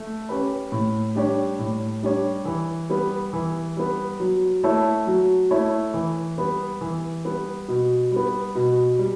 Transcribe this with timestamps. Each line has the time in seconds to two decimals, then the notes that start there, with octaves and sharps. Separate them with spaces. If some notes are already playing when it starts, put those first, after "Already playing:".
Already playing: A3
0.29 C#4 G4 B4
0.72 A2
1.15 G3 D4 G4 C#5
1.59 A2
2.03 G3 D4 G4 C#5
2.45 E3
2.90 G3 B3
3.33 E3
3.77 G3 B3
4.20 F#3
4.63 A3 E4 A4 C#5
5.07 F#3
5.51 A3 E4 A4 C#5
5.94 E3
6.38 G3 B3
6.81 E3
7.25 G3 B3
7.68 B2
8.11 G3 B3
8.55 B2
8.99 G3